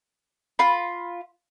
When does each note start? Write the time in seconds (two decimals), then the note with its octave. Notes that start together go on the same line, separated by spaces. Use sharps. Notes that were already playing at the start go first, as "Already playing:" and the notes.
0.59 F4 B5